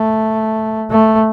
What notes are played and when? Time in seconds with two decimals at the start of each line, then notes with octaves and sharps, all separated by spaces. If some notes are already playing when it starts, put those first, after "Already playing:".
Already playing: A3
0.90 A3